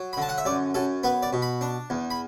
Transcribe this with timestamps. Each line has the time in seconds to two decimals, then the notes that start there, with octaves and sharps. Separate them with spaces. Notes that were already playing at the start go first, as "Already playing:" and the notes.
Already playing: F#3
0.13 B5
0.17 D3 A5
0.29 F#5
0.38 E5
0.45 F#2 D5
0.74 F#2 A4
1.03 B3 B4
1.23 D5
1.33 B2
1.42 B5
1.61 D4
1.90 E2
2.10 B5